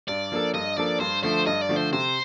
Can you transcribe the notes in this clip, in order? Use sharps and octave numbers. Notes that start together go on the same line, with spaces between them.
G2 D5
F3 A#3 D4 A4
G2 D#5
F3 A#3 D4 A4 D5
G2 C5
D3 F3 A3 C5
G2 D#5
D5
D3 F3 A3
C5
C3 C5